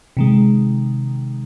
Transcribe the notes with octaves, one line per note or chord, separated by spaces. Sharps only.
C3 D#3 G#3